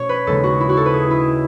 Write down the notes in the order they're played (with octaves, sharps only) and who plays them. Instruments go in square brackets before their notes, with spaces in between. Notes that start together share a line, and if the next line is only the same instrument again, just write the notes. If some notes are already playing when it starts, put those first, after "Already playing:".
Already playing: [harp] B2 A3 C#4 C#5
B4
D#2 C#3 G#3 A4
F#4
E4
F#4
A4
B4
G#4
E4